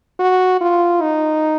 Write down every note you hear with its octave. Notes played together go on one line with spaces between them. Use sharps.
F#4
F4
D#4